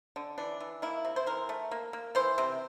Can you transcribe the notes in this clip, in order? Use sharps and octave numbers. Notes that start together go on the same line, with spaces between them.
D3
E3 D4
E3
A#3 E4
C3
C5
E3 A#4
A3
A#3
A#3
E3 C5
C3